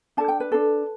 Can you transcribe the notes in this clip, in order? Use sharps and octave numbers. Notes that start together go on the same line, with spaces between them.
D4 A4 A5
G5
B4
D4 A4